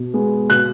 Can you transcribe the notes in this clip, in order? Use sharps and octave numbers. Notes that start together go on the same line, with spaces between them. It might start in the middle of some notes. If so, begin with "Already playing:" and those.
Already playing: B2
G#3 B3
B2 F#6